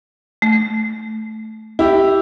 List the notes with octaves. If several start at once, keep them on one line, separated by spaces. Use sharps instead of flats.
A3
E4 G4